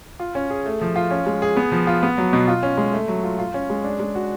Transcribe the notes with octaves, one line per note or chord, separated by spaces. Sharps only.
F4
C#4
G#4
A3
F3
F4
C#4
G#3
G#4
B3
F3
F4
B3
F#3
B2
F4
C#4
G#3
A3
F#3
F4
F4
C#4
G#3
D4
G#3
F#4